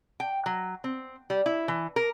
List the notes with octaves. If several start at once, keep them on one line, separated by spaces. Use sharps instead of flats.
G5
F#3
C4
G3
E4
E3
A#4